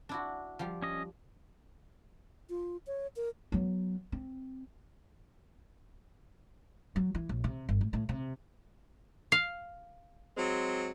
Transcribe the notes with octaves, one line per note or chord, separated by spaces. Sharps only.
D4 E4 F#4
F3 G3
C#4 D#5
F4
C#5
A#4
F#3 B3
C4
F#3
E3
A#1
C3
G1
A2
A2
C3
F5
F#3 G#3 C4